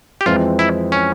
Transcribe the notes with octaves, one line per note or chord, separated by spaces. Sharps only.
G4
F2 E3 G#3 C4 F4
E4
C#4